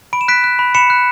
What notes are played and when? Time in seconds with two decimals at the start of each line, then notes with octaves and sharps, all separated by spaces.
0.13 B5 D7
0.21 E7
0.28 F#6 B6 D7
0.44 F#6
0.59 B5
0.75 B5 C#7 E7
0.90 F#6